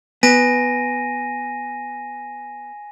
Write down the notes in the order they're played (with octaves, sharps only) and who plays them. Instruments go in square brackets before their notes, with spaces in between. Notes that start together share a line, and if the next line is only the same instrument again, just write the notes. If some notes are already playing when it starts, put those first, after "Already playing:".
[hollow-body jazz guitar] B3 [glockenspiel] G#5 A#6 D#7